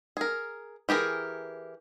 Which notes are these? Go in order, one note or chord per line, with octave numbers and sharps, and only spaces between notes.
G#4 A#4
E3 G4 G#4 A#4